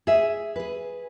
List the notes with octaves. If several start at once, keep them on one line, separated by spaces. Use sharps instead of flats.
G#4 E5
G#4 B4